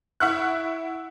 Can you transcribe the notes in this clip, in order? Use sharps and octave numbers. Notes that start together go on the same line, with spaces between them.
E4 E5 F#5 C#6 F#6